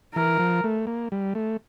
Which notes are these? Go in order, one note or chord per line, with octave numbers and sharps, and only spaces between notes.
E3 A#4
F3
A3
A#3
G3
A3